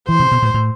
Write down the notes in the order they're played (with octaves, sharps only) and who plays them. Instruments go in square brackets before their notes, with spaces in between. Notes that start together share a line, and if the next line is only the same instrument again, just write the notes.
[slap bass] E3 [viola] C5
[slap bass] C3
B2
A2
A2